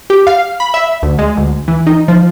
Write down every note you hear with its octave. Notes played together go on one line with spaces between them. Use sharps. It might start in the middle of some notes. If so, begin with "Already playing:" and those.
G4
F5
B5
E5
D2
G#3
D2
E3
D#4
F3